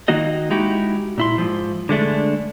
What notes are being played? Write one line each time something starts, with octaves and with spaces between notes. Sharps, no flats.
D#3 A#3 D#4 F#4 D#5
G#3 D#4 E4 F#4 G4
A#2 E4 C6
G#2 F3
D3 G#3 A3 D4